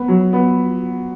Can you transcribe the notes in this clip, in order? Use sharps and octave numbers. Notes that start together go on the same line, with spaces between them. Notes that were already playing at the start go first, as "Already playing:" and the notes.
Already playing: B3
F#3
B3